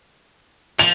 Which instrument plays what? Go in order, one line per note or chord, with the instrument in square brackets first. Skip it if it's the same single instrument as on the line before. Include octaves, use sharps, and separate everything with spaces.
[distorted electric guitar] F3 [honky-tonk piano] F7